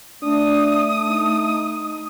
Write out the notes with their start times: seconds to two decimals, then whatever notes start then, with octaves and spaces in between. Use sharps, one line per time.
0.23 A3 D4 D#6
1.08 D#4